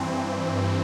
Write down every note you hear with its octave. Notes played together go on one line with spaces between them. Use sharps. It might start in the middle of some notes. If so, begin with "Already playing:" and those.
Already playing: G2 E3 C4